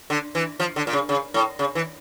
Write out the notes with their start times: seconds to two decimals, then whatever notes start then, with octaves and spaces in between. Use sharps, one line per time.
0.10 D3
0.35 E3
0.60 F3
0.76 D3
0.87 A#2
0.93 C#3
1.09 C#3
1.34 A2
1.59 C#3
1.75 E3